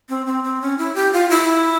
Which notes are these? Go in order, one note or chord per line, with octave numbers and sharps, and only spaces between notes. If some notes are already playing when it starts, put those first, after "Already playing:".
C4
C4
C4
C#4
E4
G4
F4
E4